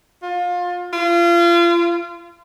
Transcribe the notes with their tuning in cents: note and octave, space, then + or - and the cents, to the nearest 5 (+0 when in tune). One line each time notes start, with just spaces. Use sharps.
F4 +25
F4 -30